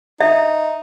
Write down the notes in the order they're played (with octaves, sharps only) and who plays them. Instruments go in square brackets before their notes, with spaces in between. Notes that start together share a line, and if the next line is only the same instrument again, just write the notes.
[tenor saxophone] D#4 [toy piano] E5